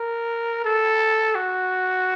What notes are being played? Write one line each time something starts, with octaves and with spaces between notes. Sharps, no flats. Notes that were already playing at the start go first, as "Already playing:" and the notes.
Already playing: A#4
A4
F#4